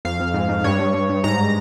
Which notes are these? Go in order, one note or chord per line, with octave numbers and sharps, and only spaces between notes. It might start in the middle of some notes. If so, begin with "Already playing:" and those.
F2 F5
F2
G#2
G#2
G2 C#5
G2
G2
G2
G#2 A#5